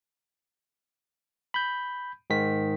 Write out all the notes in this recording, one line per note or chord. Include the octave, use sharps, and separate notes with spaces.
B5 G6
G#2 D#3 B6